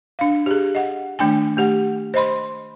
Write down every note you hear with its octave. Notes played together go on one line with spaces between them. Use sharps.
D4 F5
G4 G#4
D#5 F#5
D#3 A3 D4 G5 G#5
A3 G4 F#5
C5 D#5 B5 C6